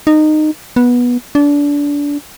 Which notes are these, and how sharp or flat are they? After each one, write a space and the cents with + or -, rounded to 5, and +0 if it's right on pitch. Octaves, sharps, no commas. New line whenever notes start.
D#4 -20
B3 -15
D4 -25